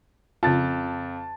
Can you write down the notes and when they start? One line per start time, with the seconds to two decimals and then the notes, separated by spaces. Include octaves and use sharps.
0.43 F2 C#3 F4 A5 A6